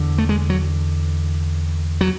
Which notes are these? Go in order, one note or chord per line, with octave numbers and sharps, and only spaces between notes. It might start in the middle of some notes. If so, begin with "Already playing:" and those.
Already playing: E2 D3
A3
G#3
F#3
F#3